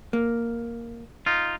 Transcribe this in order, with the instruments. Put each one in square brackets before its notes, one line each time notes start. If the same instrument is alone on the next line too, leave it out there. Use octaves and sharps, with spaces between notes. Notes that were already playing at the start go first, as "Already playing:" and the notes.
[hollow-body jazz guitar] A#3
[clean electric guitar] D#4 F4